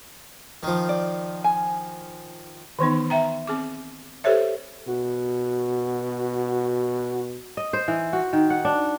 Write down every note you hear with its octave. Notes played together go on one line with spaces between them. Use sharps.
D#3 F3
D5
G#5
D#3 E3 B3 D#4
E5 G5 A#5
C4 G#4 D6
G4 A4 C5 C#5 E5
B2 F#4
D#5
C5
E3
F#4
D#3
F#5
D4